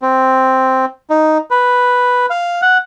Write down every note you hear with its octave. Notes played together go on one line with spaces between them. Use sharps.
C4
D#4
B4
F5
F#5